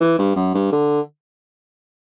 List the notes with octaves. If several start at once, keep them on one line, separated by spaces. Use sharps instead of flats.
E3
G2
F#2
G2
D3